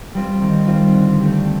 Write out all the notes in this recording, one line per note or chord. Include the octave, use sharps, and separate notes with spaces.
G3 C4 F4
D#3
G3 C4 F4
D3
A3 C4 G4